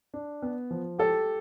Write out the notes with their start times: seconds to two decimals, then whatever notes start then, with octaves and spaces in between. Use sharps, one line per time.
0.14 D4
0.42 B3
0.71 F3
0.99 G4 A4